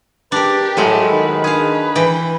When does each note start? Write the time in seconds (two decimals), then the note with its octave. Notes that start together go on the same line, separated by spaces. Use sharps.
0.32 D4 G4 A#4 B4
0.77 A2 F#3 G#3 A4
1.11 D#3 B4
1.44 D4 G#4 F5
1.95 E3 G5 B5